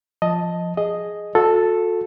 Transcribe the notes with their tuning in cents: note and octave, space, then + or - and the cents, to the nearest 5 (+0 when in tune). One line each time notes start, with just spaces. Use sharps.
F3 +0 D#5 +5 A5 +0
G#4 +0 D#5 +0
F#4 -40 A4 +0